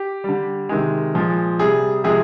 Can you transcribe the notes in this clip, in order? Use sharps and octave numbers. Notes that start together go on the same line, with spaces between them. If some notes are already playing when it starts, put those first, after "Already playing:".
Already playing: G4
D3 G3
C3 D#3 G#3
A#2 F3 G#3
C3 G3 G#4
C3 F3 G#3 G#4